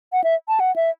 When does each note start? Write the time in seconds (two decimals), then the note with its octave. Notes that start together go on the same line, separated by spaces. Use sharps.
0.13 F#5
0.24 E5
0.48 A5
0.60 F#5
0.76 E5